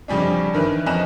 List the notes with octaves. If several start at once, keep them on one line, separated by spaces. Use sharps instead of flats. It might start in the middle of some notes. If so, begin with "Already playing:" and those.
F2 C#3 G3 C#4 D4
G2 D#3 E3 B4
F2 C#4 D#5 A#5 F#6 E7